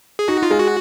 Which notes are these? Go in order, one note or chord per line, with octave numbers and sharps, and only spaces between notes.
G#4
D#4 F#4
F4
G#3
F#4